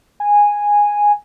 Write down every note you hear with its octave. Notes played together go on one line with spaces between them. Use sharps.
G#5